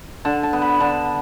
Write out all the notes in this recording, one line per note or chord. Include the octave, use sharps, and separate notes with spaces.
D3 A5
A5
B3
B5
D3 A5